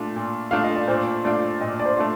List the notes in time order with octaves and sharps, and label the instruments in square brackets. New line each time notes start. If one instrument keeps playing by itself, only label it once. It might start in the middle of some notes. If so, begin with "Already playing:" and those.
Already playing: [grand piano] A#2 A3 D4 F4
A#2
[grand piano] A3 D4 F4 [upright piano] F5
[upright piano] D#5
D5
[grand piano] A#2 [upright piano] C5
[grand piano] A3 D4 F4 [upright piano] D5
[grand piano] A#2 [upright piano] D#5
[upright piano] D5
C5
[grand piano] A3 D4 F4